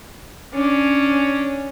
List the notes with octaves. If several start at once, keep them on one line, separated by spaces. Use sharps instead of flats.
C#4 D4